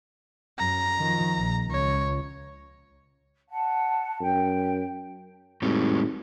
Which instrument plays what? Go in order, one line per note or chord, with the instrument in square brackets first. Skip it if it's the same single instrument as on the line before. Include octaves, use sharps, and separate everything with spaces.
[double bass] F#2 [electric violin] A#5
[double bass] D#3 F3
A#1
[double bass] C#2 [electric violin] C#5
[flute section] F#5 A5
[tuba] F#2 [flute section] G5
[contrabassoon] G#1 [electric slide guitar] A2 G3